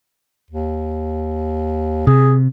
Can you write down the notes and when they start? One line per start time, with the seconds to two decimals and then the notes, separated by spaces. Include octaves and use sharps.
0.51 D#2
2.07 C3 G#4